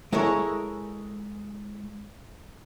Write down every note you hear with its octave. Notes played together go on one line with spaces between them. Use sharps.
G#3 E4 A4 A#4 C#5